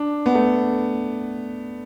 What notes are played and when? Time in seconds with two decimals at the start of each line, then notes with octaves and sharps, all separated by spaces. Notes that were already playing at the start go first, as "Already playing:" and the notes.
Already playing: D4
0.26 B3
0.35 A3